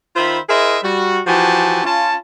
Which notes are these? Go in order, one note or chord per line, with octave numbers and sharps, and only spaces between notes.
D#3 F4 C5 E5 B5
E4 G#4 A#4 C5 D#5 E5
G3 F#4
E3 F3 F#4 G4 G#5 A5
C#4 F4 A5